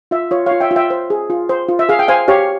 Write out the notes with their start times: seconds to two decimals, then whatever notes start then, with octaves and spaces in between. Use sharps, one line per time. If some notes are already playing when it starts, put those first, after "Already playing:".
0.11 F4 E5
0.31 F4 C#5
0.46 F4 C#5 F5
0.60 E5 G5
0.71 F4
0.76 E5 G5
0.90 C5
1.10 G#4
1.30 F4
1.49 C5
1.69 F4
1.79 E5
1.89 G#4 F5
1.99 G5
2.08 C5 F5 G#5
2.28 G4 C#5 F5